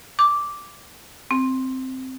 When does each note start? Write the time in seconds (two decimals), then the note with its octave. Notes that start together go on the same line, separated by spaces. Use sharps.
0.19 D6
1.31 C4